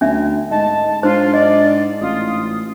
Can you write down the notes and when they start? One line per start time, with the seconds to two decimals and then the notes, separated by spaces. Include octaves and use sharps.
0.01 D2 C#4 D4 E5
0.51 G#2 D#5 A5
1.03 G#2 D4 F4 C5
1.34 D5 D#5
2.01 A1 F4 D#6